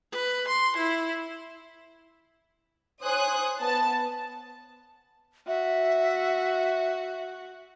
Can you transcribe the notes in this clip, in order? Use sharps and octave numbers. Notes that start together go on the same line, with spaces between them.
B4
C6
E4
C5 C#5 G#5 D#6 F#6
B3 A5
F#4 E5